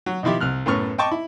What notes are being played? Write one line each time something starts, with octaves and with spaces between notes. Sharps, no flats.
F#3
B2 D#3 F3 E4 G4
C2 F6 F#6
F#2 A2 B3 C#6 F6
D#5 G5 A5 C#6 D6
E4